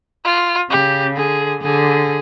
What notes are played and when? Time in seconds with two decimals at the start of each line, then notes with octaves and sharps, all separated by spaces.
0.25 F4
0.70 C#3 G4
1.17 D3 G#4
1.62 D3 G#4